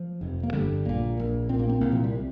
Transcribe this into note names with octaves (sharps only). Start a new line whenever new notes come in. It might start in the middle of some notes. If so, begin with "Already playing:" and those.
Already playing: F3
F1 F2 C3
A#3
G1 G2 D3 G3
A#1 A#2 A#3
A#1 A#2
A#2 C4
A#1 A#3
C4
C2 A#2 A#3
F3
G3
C3